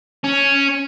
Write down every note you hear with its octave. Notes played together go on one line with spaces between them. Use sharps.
C#4